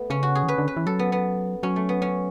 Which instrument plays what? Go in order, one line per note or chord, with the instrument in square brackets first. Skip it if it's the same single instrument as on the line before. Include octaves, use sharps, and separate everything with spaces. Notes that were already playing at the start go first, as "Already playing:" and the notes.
Already playing: [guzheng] A3 B3
[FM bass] C#3 [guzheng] C#4
[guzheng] F#4
G#4
[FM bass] E3
[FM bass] D3 [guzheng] B4
[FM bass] D3
[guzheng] B4
[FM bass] E3
[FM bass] F#3 [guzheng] A4
[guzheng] B3
B3
[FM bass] F#3 [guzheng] C#4
[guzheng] A3
B3
C#4